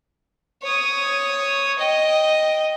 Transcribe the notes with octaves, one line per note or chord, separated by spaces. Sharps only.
C#5 D#6
D#5 G5